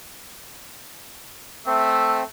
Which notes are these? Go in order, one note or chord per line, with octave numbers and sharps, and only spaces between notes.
A3 C4 E5